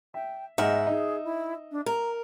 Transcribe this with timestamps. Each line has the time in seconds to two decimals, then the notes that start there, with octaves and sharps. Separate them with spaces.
0.14 E5 G5
0.58 G#2 D#5 E5 F#5 F6
0.87 D#4 G#4
1.24 E4
1.71 D4
1.86 A#4 A#5